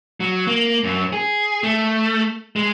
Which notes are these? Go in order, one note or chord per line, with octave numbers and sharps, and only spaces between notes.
F#3
A#3
F#2
G#4
A3
G#3